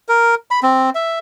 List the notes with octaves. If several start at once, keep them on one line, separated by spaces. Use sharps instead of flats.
A#4
B5
C4
E5